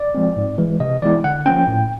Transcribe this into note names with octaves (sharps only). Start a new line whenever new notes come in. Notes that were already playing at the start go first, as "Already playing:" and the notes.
Already playing: D5
F3 G#3 C4
G#2
E3 G#3
C3 D#5
E3 G#3 B3 E4 D5
D3 F#5
F3 A#3 C#4 G5
A2